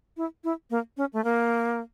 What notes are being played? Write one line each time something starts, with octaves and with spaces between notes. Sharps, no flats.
E4
E4
A#3
C#4
A3
A#3